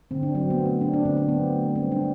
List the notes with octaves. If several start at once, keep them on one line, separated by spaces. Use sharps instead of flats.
D3 C4
D4
F#3 C4
B3
A3
C4
D3 D4
D4
D3 C4
C4
F#3 B3
A3
G3 C4
D4